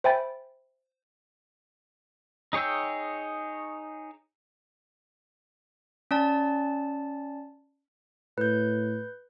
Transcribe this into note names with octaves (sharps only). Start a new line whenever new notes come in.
C5 E5 G5 G#5 B5 A6
D#4 G#4 C#5 G5 E6
C#4 D5 A5
A2 B4 G6